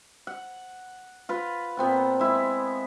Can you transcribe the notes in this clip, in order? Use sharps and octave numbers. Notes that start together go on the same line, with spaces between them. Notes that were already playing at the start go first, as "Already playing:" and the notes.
F#5
F4 B4
A#2 B3 C4 F#5
G#3 E4